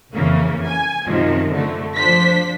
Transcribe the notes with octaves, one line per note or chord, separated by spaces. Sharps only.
F2 C#3 E3 A#3
G#5
F#2 C3 D#3 F3
D3 A3
F3 D4 C5 B6